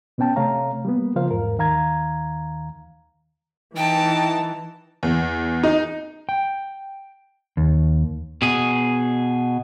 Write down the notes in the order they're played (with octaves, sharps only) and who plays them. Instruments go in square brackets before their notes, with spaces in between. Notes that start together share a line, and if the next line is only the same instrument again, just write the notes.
[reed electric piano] B2 B3 C#4 G5 A5
C3 A3 C#5 F5 A#5
G3 A#3 B3
C#3 F3 F4 A#4 C5 F5
E2 G#2 A#4
D#2 D#3 F5 A#5 G#6
[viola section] E3 [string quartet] D#4 A5 [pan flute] G5
[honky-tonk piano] E2
D#4
[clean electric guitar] G5
D#2
[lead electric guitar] B2 G#4